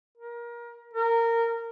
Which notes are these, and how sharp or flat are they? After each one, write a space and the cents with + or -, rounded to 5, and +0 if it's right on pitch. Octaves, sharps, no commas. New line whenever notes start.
A#4 +25
A#4 -15